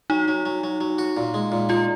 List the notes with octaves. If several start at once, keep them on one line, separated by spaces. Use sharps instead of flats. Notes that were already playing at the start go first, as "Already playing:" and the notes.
F#3 D#4
F#3
F#3
F#3
F#3
F#4
A#2
G#3
A#2
G#3 F4